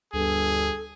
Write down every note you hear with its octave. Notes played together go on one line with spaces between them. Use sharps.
G1 D2 G2 G#4 A4